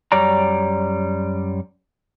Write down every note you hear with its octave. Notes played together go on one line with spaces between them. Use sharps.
F#2 G3 C#5 D5 A#5